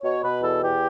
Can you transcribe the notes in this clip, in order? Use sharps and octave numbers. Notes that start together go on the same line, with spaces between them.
B2 C#5
B2 B4
E2 A4
E2 G4